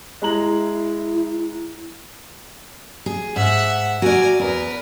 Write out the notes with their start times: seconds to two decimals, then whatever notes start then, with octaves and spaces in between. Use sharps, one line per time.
0.22 G#3 E4 A#5 F#7
3.06 G#4
3.36 G#2 E5 F#5
4.02 F#4 A#4 D5 G#5
4.40 E2 A#4 B4